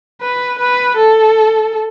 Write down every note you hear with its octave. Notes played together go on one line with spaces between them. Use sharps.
B4
B4
A4